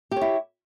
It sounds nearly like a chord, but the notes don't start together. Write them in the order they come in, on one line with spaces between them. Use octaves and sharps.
G4 C#5 E4